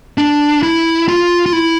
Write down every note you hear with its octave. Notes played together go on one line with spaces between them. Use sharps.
D4
E4
F4
F4
E4